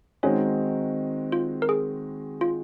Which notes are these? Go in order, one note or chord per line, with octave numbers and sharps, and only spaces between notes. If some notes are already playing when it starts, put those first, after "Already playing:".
D#3 G#3 C4 C#4 D#4 F#4 C#5
F4
A#4
G#4
F4